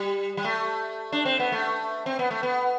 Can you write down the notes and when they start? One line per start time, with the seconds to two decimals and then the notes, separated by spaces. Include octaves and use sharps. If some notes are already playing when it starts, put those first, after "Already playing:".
Already playing: G3
0.37 G3
0.44 A3
1.12 D4
1.25 C4
1.39 B3
1.52 A3
2.06 C4
2.19 B3
2.31 A3
2.43 B3